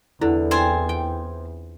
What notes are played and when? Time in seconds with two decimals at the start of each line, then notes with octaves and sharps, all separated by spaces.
0.21 E2 D3 E4
0.51 C4 F4 C5 G#5 C6
0.89 G5